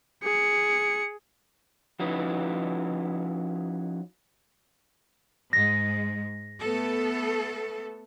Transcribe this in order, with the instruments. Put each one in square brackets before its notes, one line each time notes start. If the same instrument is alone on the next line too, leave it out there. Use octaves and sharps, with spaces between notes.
[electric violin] G#4 C#7
[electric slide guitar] F3 C#4 D#4 E4 F#4 B4
[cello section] G#2 G#3 [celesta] A#6
[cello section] A3 B3 A4